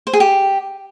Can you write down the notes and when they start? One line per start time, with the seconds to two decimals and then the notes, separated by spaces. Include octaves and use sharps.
0.07 C5
0.13 G#4
0.20 G4